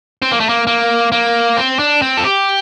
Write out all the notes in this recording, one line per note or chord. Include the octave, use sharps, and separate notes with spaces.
C4
A#3
A3
A#3
A#3
A#3
C4
D4
C4
A4
G4